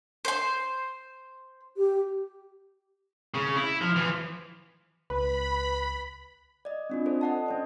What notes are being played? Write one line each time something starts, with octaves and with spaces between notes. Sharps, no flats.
C5 C6
G4
C#3
E4
F3
E3 F3
C#2 B4 B5
D5 D#5
C4 D4 F4
A4 C5 D5 D#5
D#5 F#5 A5
C#4 C5 D5